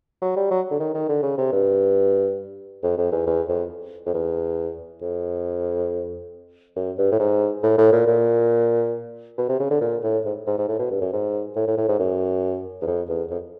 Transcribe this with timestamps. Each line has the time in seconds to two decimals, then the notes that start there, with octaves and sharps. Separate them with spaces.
0.22 F#3
0.36 G3
0.51 F#3
0.71 D3
0.80 D#3
0.94 D#3
1.09 D3
1.23 C#3
1.38 C3
1.52 G2
2.83 F2
2.98 F2
3.12 E2
3.27 E2
3.48 F2
4.06 F2
4.14 E2
5.02 F2
6.76 F#2
6.98 G2
7.12 A2
7.20 G#2
7.63 A2
7.78 A2
7.93 A#2
8.07 A#2
9.38 B2
9.49 C3
9.60 C#3
9.70 D3
9.81 A#2
10.03 A2
10.25 G#2
10.47 G#2
10.58 G#2
10.68 A2
10.79 B2
10.91 G2
11.01 F#2
11.13 G#2
11.56 A2
11.67 A2
11.77 A2
11.89 G#2
12.00 F#2
12.82 E2
12.87 F2
13.09 E2
13.30 F2